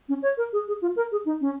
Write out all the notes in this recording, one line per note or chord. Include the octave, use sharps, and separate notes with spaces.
C#4
C#5
A#4
G#4
G#4
F4
A#4
G#4
D#4
C#4